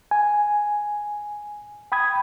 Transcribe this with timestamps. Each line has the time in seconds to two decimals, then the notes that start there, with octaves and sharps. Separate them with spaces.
0.11 G#5
1.92 G5 B5 D#6 G#6